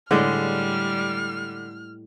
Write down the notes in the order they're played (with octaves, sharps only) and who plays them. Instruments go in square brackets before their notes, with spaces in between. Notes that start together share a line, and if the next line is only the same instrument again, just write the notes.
[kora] A2 G#3 D#5 [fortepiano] D3 [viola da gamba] G3 [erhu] F6